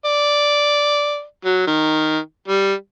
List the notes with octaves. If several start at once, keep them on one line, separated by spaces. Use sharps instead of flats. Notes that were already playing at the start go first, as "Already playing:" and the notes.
D5
F#3
D#3
G3